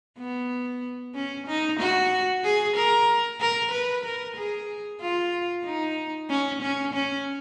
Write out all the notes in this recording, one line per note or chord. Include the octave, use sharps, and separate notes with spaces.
B3
C#4
D#4
F#4
G#4
A#4
A#4
B4
A#4
G#4
F4
D#4
C#4
C#4
C#4